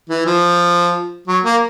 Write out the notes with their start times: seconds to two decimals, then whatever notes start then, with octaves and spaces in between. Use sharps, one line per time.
0.09 E3
0.27 F3
1.28 F#3
1.45 A#3